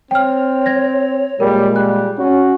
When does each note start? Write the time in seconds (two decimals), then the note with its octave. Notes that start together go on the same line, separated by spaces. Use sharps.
0.11 C4 C#5 G5 F6
0.66 G#6 A#6
1.40 A#2 G3 G#3 A#4
1.76 G3 F#6
2.19 C#4 F#4